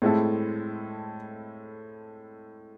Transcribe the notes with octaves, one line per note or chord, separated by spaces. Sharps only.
A2 G#3 C4 E4 A4